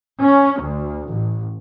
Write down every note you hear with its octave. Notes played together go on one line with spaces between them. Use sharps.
C#4
D2
A1